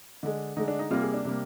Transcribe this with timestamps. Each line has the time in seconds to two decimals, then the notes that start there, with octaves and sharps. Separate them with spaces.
0.23 D3 G#3
0.57 D3 G#3 D#4
0.68 D4
0.79 D#4
0.90 C3 G3 A#3 F4
1.02 G#4
1.14 D4
1.25 C3 G3 A#3